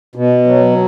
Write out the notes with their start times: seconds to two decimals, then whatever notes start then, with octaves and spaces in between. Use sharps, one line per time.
0.15 B2
0.46 F#3